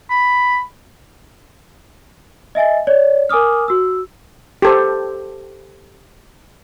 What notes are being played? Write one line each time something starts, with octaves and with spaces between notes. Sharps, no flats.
B5
D#5 E5 G#5 A6
C#5 D5
A#4 G#5 D6 D#6 F6
F#4 E6
G4 A4 C5